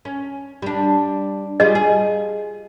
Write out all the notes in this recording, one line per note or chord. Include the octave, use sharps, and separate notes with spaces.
C#4
G3 D4
G3 F4 G#4 D#5
G#4